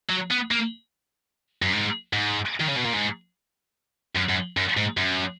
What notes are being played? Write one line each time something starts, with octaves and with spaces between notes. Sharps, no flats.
F#3
B3
A#3
F#2
G#2
G#2
D#3
C#3
B2
A#2
G#2
F#2
F#2
F#2
G#2
F#2